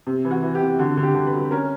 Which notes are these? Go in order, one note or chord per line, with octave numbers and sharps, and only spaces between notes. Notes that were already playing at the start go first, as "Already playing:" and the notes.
C3
E3
F#4
E3
G4
C3
D3 F#4
D3
G4
D3
B4
F#3
C#4 A#4